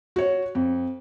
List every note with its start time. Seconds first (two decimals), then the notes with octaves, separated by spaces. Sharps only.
0.16 F#4 C#5
0.55 F2